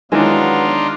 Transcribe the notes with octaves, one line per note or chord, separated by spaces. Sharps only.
D#3 E3 F#3 G#3 B3 D4 D#4 F4